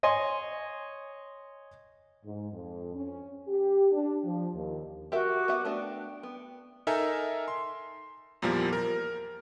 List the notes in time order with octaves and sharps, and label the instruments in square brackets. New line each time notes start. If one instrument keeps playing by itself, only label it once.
[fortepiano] C#5 D#5 G#5 C6
[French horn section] G#2
F2
C#4
G4
D4
F3
D#2
[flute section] F#4 D6 [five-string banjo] G4 A#4 E5
[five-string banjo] B3 E5 F#5
[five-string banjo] A3 B3 D4 [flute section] G5
[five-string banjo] B3
[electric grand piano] D#4 A4 A#4 E5 G#5 A#5
C6
E2 A#2 F3 G3 A#3
A#4 A#5